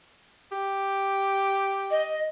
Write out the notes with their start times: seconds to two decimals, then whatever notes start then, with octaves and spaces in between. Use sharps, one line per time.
0.52 G4
1.90 D#5